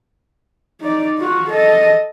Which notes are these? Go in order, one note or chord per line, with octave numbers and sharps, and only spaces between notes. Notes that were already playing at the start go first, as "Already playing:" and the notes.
D#4 D5
F4 F#4
A4 D#5